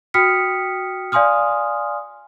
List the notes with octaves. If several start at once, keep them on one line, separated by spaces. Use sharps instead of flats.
F#4 G5 D#6 F6 B6 C#7
D5 F5 G#5 C6 D#6 F6